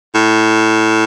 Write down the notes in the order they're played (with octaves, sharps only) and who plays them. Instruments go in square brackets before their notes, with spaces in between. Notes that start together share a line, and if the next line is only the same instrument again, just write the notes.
[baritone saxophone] A2